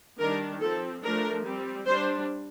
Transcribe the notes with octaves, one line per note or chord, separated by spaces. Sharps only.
D#3 G3 D4 A#4
F3 C4 A4
F3 A3 D4 A#4
G3 C4
G3 D4 C5